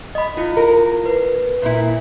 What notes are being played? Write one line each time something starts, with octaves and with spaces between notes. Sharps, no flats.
D#5 B5
E4 F4
A#4
B4
A#2 E4